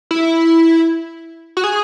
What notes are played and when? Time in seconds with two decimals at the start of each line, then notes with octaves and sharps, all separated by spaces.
0.11 E4
1.57 F#4
1.64 G#4